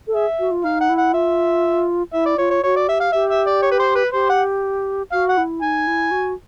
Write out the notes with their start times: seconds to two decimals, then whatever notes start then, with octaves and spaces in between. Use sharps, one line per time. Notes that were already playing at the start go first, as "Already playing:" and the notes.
0.07 A4
0.14 G#4 E5
0.39 F#4
0.51 F4
0.64 D#4 F5
0.81 F#5
0.89 E4
0.97 F#5
1.13 F4 E5
2.13 E4 E5
2.26 D5
2.38 F4 C#5
2.50 C#5
2.63 F#4 C#5
2.76 D5
2.88 G4 E5
3.00 F5
3.12 G4 E5
3.29 E5
3.46 D5
3.62 C#5
3.71 B4
3.79 C5
3.96 B4
4.13 G4 C5
4.29 F#5
5.12 F#4 F5
5.29 F#5
5.37 E4
5.62 D#4 G#5
5.87 E4
6.11 F#4